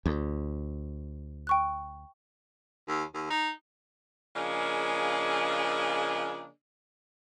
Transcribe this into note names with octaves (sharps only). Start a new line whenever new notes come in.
D2
G5 C#6 F#6
D#2
D#2
D#4
C#3 F3 A#3 D4 G#4 D#5